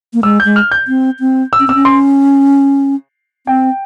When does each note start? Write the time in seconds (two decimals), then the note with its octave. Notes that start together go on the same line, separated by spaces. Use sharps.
0.14 A#3
0.23 G#3 E6
0.40 G6
0.45 G#3
0.56 F6
0.72 G6
0.88 C4
1.20 C4
1.53 E6
1.60 C#4
1.67 C4 E6
1.75 C#4
1.85 C6
3.47 C4 G5